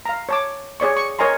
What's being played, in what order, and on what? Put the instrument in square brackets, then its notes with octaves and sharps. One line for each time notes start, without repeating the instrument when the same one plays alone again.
[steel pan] F5 A#5
C#5 A5 D6
G#4 C#5 D5 C#6
C#6
A#4 C#5 D#5 G#5 A#5 C6